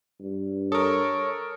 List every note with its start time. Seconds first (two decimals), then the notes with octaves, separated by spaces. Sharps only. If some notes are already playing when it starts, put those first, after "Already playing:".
0.20 G2
0.72 A4 A#4 C#5 D#6